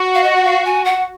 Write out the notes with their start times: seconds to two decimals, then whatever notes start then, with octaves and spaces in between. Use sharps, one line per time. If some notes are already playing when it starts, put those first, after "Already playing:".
Already playing: F#4
0.15 F5
0.24 D#5
0.36 F#5
0.44 F5
0.65 G#5
0.85 F#5